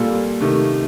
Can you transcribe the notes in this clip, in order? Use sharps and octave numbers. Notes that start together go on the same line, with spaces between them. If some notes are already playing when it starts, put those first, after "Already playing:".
Already playing: A#2 G3 A#3 F4 A4
C3 D#3 A3